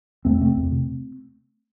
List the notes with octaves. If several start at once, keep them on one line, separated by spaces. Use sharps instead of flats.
E2 A3 C4
C3 A3 C4
E2
C3